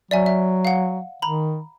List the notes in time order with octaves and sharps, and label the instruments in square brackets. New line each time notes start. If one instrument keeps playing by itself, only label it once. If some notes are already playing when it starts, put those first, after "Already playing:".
[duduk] F#3 [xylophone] D5 E5 G#5
[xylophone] E5
F5 F#5
[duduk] D#3 [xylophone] A#5 B5